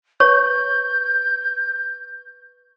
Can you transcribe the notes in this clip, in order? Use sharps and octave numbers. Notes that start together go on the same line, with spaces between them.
B4 C#5 C#6 G6